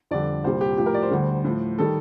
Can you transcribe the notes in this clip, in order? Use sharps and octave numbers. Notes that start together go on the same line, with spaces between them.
F2 D3 G3 D5
C2 A#2 G3 C5
G4
A2 F3 G4
A#4
D5
C5
D2 D3 G3
A2 F3
D#3 G3 A4